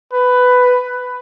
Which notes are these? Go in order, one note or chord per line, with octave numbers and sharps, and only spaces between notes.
B4